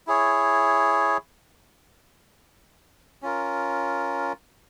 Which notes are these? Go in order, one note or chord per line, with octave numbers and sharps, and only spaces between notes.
E4 G#4 C#5
C#4 F4 A#4